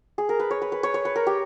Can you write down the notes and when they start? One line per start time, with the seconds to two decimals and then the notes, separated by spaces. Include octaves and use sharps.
0.18 G#4
0.29 A#4
0.40 B4
0.51 C#5
0.62 B4
0.72 B4
0.83 C#5
0.94 C#5
1.05 B4
1.16 A#4
1.27 G4